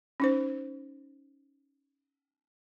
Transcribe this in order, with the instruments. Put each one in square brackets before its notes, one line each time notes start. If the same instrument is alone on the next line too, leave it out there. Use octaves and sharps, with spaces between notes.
[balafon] C#4 D#4 C5